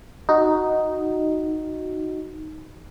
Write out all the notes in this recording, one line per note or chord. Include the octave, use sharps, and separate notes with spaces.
D#4 F#4